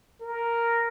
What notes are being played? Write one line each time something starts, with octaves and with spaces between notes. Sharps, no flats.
A#4